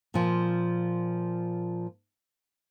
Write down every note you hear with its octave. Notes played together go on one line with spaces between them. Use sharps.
A#2 F3